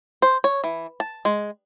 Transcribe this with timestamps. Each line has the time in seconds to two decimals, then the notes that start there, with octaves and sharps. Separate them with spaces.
0.22 C5
0.44 C#5
0.64 E3
1.00 A5
1.25 G#3